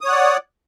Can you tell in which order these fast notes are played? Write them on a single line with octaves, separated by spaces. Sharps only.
D#6 C#5 F#5 D5